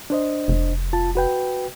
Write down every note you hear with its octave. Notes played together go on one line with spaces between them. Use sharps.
D4 C5 D#5
F1
F4 A5
F#4 B4 G5